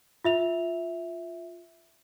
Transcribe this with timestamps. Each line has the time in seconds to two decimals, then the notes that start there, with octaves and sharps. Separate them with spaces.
0.24 F4 E5 F7